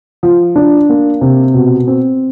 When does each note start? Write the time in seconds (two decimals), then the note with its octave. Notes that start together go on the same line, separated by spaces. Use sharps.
0.23 F3
0.56 D4
0.89 A#3
1.21 C3
1.54 B2
1.87 C4